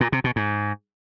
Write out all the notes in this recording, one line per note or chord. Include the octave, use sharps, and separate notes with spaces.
A#2
C3
B2
G#2